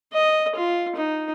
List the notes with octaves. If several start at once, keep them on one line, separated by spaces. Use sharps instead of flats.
D#5
F4
D#4